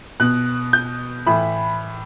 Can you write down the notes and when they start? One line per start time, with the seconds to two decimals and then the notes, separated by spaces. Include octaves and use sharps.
0.20 B2 F#6
0.73 G6
1.26 A2 E3 B5